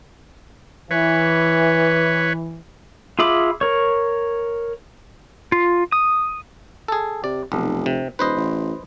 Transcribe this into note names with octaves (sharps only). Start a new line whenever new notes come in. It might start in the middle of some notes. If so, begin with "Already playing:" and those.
E3 B4 C#5
F4 G#4 E5 B5 D6
A#4 C#5
F4
D#6
G#4 A4
C3 D5
F1 B1
C3
D#1 B4 C5 D#5
A1